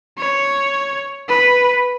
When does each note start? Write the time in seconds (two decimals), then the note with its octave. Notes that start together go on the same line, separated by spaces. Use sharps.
0.18 C#5
1.29 B4